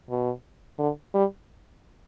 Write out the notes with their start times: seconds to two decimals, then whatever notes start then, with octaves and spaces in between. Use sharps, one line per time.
0.10 B2
0.78 D3
1.14 G3